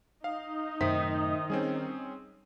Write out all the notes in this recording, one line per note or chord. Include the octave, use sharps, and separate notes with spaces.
D#4 D#5 F5
F#2 A2 C3 D#3 C5 E5 B6
G3 C4 C#4 G#4